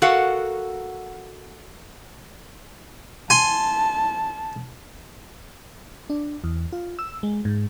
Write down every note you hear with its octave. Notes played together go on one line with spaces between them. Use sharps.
F#4 A4 A#4 F5 F#5
G#5 A5 C6
D4
E2
F4
E6
G#3
G#2